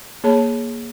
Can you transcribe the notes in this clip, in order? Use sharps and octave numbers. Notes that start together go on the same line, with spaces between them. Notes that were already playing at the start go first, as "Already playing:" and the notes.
A#3 G#4 C#5 A5 B5